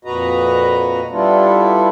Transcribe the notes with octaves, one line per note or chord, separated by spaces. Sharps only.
F2 A#2 F#4 B4 D#5 A#5
G3 B3 D4 E4 F4 A4